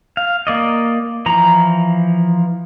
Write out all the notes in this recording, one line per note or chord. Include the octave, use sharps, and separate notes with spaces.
F5
A#3 D5 D#5
E3 F3 A#5